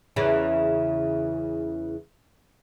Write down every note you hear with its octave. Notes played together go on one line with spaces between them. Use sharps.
E2 C#3 E3